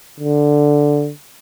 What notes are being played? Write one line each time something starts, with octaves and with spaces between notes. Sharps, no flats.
D3